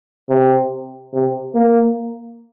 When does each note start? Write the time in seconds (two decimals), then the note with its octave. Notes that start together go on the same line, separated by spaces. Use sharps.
0.29 C3
1.13 C3
1.55 A#3